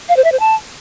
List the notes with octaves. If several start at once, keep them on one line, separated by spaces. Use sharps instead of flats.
F5
C5
E5
C5
A5